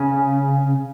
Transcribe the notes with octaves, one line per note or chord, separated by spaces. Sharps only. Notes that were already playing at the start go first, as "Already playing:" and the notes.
Already playing: C#3